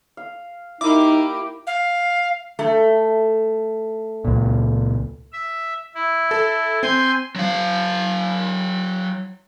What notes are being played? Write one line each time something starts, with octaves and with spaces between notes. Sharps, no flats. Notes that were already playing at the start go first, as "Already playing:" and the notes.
F5
A#3 D#4 E4 G4 D6
F5
A3
C#2 A#2
E5
E4
A4
C4 G#5 C6 G6
F#3 F5